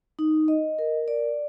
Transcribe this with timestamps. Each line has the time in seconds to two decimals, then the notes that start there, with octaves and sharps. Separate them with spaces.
0.19 D#4
0.48 D#5
0.79 A#4
1.08 D5